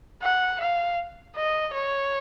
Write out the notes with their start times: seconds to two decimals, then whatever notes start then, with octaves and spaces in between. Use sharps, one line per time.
0.22 F#5
0.60 F5
1.36 D#5
1.73 C#5